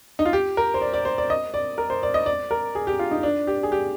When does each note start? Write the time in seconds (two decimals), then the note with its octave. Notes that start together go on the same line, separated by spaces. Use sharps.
0.19 D#4
0.25 F4
0.33 G4
0.57 A#4
0.74 C5
0.81 D5
0.93 D5
1.05 C5
1.18 D5
1.30 D#5
1.54 D5
1.78 A#4
1.90 C5
2.03 D5
2.14 D#5
2.26 D5
2.51 A#4
2.75 G#4
2.87 G4
2.99 F4
3.11 D#4
3.23 D4
3.47 G4
3.63 G#4
3.72 G4